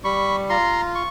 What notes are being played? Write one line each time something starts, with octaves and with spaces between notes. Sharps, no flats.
G3 B5 C#6
F4 A#5 C6
C#6